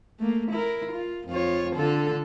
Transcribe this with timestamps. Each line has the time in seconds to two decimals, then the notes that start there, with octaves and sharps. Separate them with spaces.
0.20 A3 A#3
0.51 E4 A#4
0.92 F4
1.28 F2 F4 C#5
1.76 D3 F4 A4